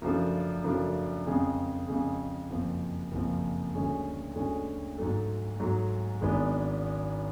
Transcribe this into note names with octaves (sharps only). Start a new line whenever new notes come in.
F#2 C#3 F3 A3 D4
F#2 C#3 F3 A3 D4
F2 C#3 G#3
F2 C#3 G#3
F#1 F2 F3
F#1 F2 F3
D2 D3 G#3 C#4
D2 D3 G#3 C#4
G#2 F#3 A3
G#2 F#3 A3
G#1 G#2 G#3 B3 D4